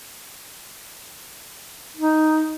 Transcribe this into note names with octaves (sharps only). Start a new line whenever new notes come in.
D#4